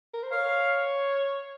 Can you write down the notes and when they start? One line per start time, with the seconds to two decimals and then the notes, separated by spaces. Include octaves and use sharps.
0.13 A#4
0.23 C5
0.32 C#5 F5